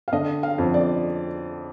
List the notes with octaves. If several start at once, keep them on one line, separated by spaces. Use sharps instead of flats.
F5
D3 D#5
F5
F2
D5